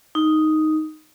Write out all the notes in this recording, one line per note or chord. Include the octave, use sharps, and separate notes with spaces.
D#4